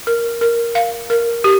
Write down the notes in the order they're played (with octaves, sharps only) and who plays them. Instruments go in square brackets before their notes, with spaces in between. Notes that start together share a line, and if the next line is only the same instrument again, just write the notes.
[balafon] A#4
A#4
F5
A#4
G4